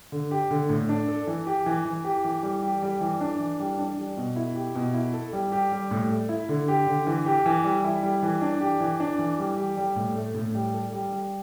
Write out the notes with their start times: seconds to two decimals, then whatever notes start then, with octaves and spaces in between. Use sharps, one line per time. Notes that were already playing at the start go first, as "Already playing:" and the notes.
0.12 D3
0.31 G4
0.51 D3
0.69 A2
0.89 D4
1.08 A4
1.27 E3
1.47 G4
1.66 E3
1.85 E3
2.04 G4
2.24 E3
2.43 G3
2.63 G4
2.82 G3
3.01 E3
3.21 D4
3.39 E3
3.60 G3
3.78 D4
3.98 G3
4.17 B2
4.36 E4
4.55 G4
4.75 B2
4.94 E4
5.13 A4
5.33 G3
5.52 G4
5.72 G3
5.91 A2
6.10 A3
6.29 E4
6.49 D3
6.68 G4
6.87 D3
7.07 E3
7.26 G4
7.46 E3
7.64 G3
7.84 E4
8.03 G3
8.23 E3
8.42 D4
8.61 G4
8.80 E3
9.00 D4
9.19 E3
9.39 G3
9.57 G4
9.77 G3
9.96 A2
10.16 A3
10.34 A2
10.54 G3
10.74 A4
10.93 G3
11.13 G3